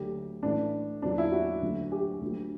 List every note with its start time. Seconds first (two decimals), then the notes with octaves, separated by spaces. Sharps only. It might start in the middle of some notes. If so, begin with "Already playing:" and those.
Already playing: D2 D3 F#3 G4
0.43 A1 A2 E3 D4
1.02 E2 D3 F#3 D4
1.18 E4
1.32 F#4
1.62 D2 D3 F#3
1.92 G4
2.21 D2 D3 F#3